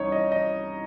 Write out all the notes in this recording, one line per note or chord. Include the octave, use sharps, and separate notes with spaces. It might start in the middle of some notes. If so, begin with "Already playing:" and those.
Already playing: C2 E3 C#4 D#4 C#5
D#5
D#5